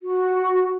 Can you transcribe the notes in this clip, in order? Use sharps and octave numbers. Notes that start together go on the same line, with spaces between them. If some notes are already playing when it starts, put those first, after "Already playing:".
F#4